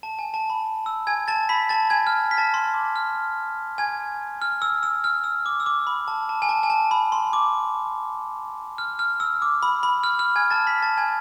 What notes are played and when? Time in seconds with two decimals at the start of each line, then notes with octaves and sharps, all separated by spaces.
0.03 A5
0.19 G#5
0.34 A5
0.50 B5
0.86 E6
1.07 G#5 G#6
1.28 A5 A6
1.49 B5 B6
1.69 A5 A6
1.90 G#5 G#6
2.07 F6
2.31 B6
2.37 A5 A6
2.54 C6
2.74 D6
2.96 F6
3.78 G#5 G#6
4.42 F6
4.62 E6
4.83 E6
5.04 F6
5.24 E6
5.46 D6
5.60 E6
5.66 D6
5.87 B5
6.08 A5
6.29 A5
6.42 G#5
6.49 A5
6.63 G#5
6.70 A5
6.91 B5
7.12 C6
7.33 D6
8.78 F6
8.99 F6
9.20 E6
9.42 D6
9.63 B5
9.83 B5
10.04 F6
10.19 F6
10.36 G#5 G#6
10.50 A5 A6
10.67 B5 B6
10.82 A5 A6
10.97 G#5 G#6